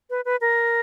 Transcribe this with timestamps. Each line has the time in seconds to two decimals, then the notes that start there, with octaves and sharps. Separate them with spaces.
0.10 B4
0.25 B4
0.41 A#4